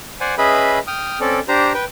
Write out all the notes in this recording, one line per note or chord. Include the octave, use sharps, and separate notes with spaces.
C5 D5 F#5 G#5
C#4 G#4 B4 D#5 E5 B5
G5 D#6 F6
C4 C#4 A4 D5
D4 G4 C5 A#5
B4 G5